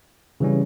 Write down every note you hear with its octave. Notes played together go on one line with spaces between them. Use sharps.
C#3 E3 G3 C#4